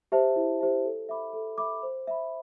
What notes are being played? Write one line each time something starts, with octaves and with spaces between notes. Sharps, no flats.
G4 C5 E5 A5
E4
G4 C5 E5 A5
A4
E5 B5 D6
A4
E5 B5 D6
C5
E5 B5